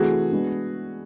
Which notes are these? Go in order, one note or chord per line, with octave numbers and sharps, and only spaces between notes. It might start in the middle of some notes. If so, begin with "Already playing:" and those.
Already playing: C3 E3 A3 F#4 G#4
G#3 B3 D4